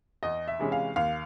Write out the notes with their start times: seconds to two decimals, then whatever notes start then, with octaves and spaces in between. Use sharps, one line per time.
0.23 E2 D#5
0.48 E5
0.59 C3 E3 G#3 C#4
0.72 F5
0.96 D#2 F5